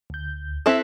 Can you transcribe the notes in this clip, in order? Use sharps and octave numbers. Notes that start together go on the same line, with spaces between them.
D2 G6
C4 E4 A4 E5 F#6 B6